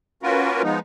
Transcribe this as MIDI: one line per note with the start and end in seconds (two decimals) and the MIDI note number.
0.23 0.62 58
0.23 0.62 61
0.23 0.62 65
0.23 0.62 66
0.23 0.62 70
0.23 0.62 71
0.63 0.79 53
0.63 0.79 56
0.63 0.79 59
0.63 0.79 63